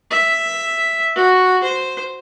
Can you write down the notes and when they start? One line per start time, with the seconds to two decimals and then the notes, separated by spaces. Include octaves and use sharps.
0.11 E5
1.16 F#4
1.64 C5